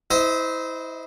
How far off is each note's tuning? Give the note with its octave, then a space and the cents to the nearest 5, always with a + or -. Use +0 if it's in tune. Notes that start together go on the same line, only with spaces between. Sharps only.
E4 -25 C5 -25 D#5 +5